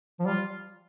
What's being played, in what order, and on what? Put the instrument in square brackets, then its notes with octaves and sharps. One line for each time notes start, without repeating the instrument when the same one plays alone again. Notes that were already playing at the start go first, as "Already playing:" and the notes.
[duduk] F3
[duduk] G3 [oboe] F4